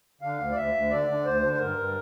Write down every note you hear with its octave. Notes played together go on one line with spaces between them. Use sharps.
D3 F5
D2
D5
D2 E5
D2
D3 D5
D3
D2 C5
D3
C5
G2 A#4
G2